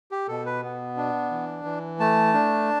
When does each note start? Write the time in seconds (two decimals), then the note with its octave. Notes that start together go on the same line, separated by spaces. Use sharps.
0.11 G4
0.28 B2 A4
0.46 B4
0.63 B3
0.97 D4
1.31 E3
1.65 E3
2.00 A3 A5
2.34 D4